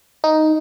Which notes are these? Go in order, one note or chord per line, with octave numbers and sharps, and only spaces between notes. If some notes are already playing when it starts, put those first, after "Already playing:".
D#4